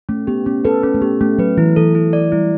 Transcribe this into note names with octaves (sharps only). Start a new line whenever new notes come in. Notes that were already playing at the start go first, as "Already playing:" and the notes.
A3 C#4
B3 G4
B3 C#4
A4 B4
C#4 A4
A3
B3 G4
A3 C#4
F#3 B4
E3 E4
E3 A4
E4
D5
G3 E4